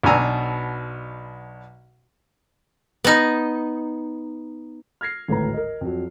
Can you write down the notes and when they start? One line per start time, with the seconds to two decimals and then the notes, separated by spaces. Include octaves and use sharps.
0.04 B1 B2 D4 G#5 A#5 E6
3.04 B3 D#4
5.01 F6 G#6 A#6 C7
5.28 G#1 D2 A2 A4 B4 A#5
5.54 A#4 D#5
5.81 F2 F#3